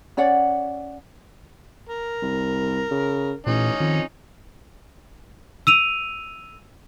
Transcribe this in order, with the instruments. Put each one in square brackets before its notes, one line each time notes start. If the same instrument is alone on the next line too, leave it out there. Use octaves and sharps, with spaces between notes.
[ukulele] C#4 C#5 D5 F#5
[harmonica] A#4
[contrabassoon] C2
C#3
[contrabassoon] A1 [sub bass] A#2 [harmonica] C#4 D#4
[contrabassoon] F2 [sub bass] D#3
[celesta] E6 D#7 F7